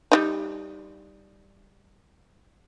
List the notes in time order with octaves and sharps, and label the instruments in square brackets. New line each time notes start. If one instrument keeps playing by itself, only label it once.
[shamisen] G3 D4 D#4